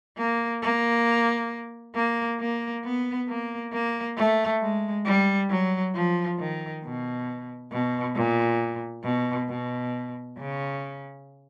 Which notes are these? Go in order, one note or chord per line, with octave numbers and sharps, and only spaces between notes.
A#3
A#3
A#3
A#3
B3
A#3
A#3
A3
G#3
G3
F#3
F3
D#3
B2
B2
A#2
B2
B2
C#3